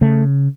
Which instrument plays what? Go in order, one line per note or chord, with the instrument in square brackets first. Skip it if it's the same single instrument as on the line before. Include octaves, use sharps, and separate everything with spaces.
[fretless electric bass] C#3 A3